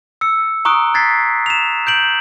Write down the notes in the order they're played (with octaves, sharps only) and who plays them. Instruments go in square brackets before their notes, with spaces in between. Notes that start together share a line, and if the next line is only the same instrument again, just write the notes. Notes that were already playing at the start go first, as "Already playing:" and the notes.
[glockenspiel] E6 C#7
A#5 C#6 D#6 F#6 D7
F#6 G#6 A6 B6 C7
E7 F7
G6 D7 F#7